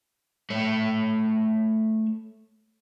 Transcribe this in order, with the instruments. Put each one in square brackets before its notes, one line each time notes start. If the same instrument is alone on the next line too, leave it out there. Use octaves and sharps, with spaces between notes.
[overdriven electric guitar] A3 C#5